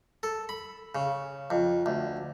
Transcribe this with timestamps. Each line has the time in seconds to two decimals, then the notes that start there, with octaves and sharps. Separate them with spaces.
0.23 A4
0.49 B5
0.95 C#3
1.50 F2
1.86 D2